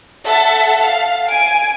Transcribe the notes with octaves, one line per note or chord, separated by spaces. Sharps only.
A4 E5 F#5 A5
F5
G#5 D7